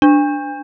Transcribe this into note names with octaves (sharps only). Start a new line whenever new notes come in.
D4